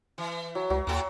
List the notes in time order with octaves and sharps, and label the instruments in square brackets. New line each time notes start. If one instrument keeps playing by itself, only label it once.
[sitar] E3
[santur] F#3
[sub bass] C#2 [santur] F#3
[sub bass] D#2 [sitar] A2 F#4 A4